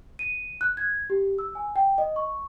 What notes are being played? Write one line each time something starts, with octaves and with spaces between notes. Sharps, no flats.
D#7
F#6
G#6
G4
E6
G#5
G5
D#5
C#6